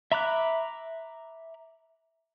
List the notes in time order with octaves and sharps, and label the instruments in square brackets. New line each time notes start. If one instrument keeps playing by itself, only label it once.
[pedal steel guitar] E5 A#5 B5 D6 F#6